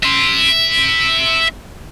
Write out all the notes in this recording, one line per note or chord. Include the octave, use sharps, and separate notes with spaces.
E5 C6